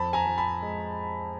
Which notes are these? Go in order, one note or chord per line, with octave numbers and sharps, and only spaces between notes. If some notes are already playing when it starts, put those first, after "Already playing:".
Already playing: F2 A5 B5
G#5 A#5
F3
A5 B5
G#3